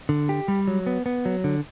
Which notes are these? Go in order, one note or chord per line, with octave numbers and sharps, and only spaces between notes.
D3
G4
G3
F#3
B3
B3
F#3
D3